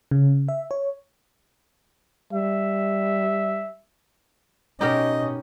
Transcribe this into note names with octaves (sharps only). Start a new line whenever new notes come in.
C#3
E5
C#5
G3 E5
B2 C#4 D#4 G4 A#4 D#5